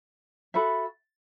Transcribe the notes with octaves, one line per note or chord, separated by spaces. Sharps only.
F#4 A4 E5 B5